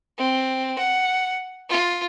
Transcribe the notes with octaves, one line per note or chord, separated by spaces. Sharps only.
C4
F#5
F4